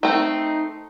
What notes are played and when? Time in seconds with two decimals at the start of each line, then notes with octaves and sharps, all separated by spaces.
0.03 A3 C4 D#4